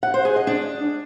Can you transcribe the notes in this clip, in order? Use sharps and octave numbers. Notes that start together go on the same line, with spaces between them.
F#5
C5
G#4
D#5
D4